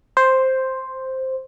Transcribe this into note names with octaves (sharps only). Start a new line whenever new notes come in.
C5